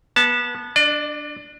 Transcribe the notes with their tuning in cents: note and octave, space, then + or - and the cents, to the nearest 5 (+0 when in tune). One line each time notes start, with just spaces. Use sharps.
B3 -25 A5 +0
D4 +0 D5 +40